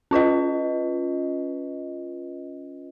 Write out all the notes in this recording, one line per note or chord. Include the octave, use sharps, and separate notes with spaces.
C#4 F4 B4 D#5